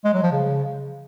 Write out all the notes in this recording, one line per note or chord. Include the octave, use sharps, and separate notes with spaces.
G#3
F#3
F3
C#3